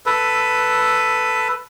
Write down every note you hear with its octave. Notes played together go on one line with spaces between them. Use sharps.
A4 B4